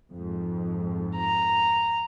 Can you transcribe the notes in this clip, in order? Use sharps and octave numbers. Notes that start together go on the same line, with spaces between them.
F2 G#2
A#5